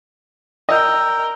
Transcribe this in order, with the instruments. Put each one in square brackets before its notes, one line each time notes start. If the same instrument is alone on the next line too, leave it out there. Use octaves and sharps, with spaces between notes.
[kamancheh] A#4 G5 [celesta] D5 E6 G6 [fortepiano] D#5